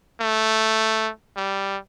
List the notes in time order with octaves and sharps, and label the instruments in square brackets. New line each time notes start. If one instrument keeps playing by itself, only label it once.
[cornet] A3
G3